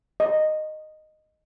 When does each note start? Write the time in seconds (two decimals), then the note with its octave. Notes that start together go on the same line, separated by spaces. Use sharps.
0.20 D#5